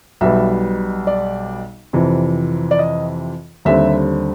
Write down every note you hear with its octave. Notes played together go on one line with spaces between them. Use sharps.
B1 B2 G3 B3 E5
D5
F2 C3 E3
D5
D#5
D#2 D3 G3 C4 E5